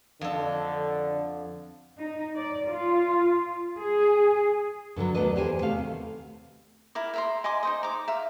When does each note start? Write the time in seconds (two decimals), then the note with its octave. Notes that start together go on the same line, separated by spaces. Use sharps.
0.21 F2 D3 A4
1.99 D#4
2.36 D5
2.69 F4
3.77 G#4
4.96 G2 D3 F3 F#3
5.14 D#2 A3 B3 D4 B4 D#5
5.36 E2 G4 C5 G#5
5.61 C3 A3 F5
5.78 D#2
6.95 E4 A#4 D6
7.14 E5 A#5 C6
7.44 D#5 G#5 C6 D6
7.63 D#4 C5 D#5
7.83 A#5 D6
8.08 E5 F5